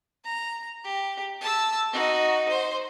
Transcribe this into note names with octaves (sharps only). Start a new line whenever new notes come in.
A#5
G4
A5 E6
D#4 F#4
C5